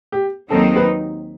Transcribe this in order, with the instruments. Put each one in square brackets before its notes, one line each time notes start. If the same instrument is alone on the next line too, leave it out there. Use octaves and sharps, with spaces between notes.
[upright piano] G4
[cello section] D#2 D#3 F#3 C4 D#4 [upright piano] A4
[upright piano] B4